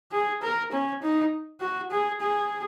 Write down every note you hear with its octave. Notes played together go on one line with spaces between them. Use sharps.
G#4
A#4
C#4
D#4
F#4
G#4
G#4